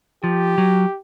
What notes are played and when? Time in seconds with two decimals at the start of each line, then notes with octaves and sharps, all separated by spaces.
0.24 F3 G4
0.58 F#3